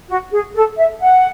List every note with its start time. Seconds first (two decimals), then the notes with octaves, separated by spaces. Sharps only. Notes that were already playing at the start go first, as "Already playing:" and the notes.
0.09 F#4
0.32 G#4
0.54 A4
0.77 E5
1.00 F#5